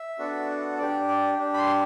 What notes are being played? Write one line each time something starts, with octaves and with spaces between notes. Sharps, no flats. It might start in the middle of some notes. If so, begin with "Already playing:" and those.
Already playing: E5
B3 D4 F#4 A4
D4 G4 D5
D5
D4 G4
B5
C6